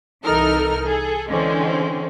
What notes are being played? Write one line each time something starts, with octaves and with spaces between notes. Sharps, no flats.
C2 E3 D#4 A4 A#4 F6
G#4 A4
D3 E3 G#3 C4 C#4